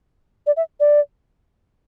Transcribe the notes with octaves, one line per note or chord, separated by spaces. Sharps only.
D5
E5
D5